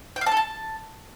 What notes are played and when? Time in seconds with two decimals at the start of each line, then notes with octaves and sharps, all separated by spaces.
0.16 G5
0.21 F5
0.26 A5
0.32 A4
0.37 A5